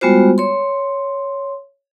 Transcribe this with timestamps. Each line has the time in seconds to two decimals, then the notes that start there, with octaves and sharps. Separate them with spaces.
0.01 G3 G#3 B3 F4 F#4 C5
0.38 C#5 C6